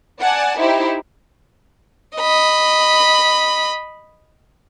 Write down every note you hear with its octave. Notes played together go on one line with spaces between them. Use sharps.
D5 F#5 G#5 A5
D#4 E4 G4 C5
D#5 B5